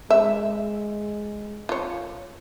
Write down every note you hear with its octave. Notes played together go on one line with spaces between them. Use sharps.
G#3 E5
F4 C#5